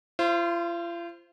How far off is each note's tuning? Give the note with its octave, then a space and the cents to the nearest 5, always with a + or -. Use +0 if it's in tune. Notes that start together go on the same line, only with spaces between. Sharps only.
F4 -40 C5 +0